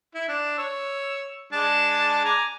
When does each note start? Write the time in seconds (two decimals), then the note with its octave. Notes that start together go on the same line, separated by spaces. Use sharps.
0.15 E4
0.29 D4
0.58 C#5 E6
1.53 G#3 D4 A5
2.25 G#5 A#5 D6